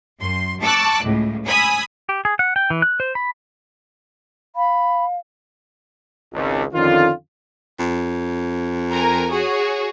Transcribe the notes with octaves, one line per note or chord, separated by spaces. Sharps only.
F#2 C6
A5 C#6 D6 E6 F#6
C#2 A2
G#5 B5 D#6 E6
G4
G#4
F#5
G5
E3
F#6
C5
B5
F5 B5
G#1 C#2
F2 D3 D#3 C#4 F4
F2
A#4 G#5 A#5
F#4 G#4 C#5